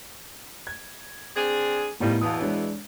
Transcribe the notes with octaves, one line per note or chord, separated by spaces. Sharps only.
G#6
C4 D4 G#4
A2 D#3 F3 G3 B3
E2 B2 E3 F5 A5 D#6
G#3 D4 C#5